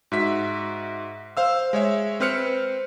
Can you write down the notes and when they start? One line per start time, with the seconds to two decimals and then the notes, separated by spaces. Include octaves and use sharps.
0.12 G#2 F#4 E5 B6
1.37 C5 F5 E6
1.73 G#3 C#5 E5
2.20 C4 B4 C5 F6 F#6 C#7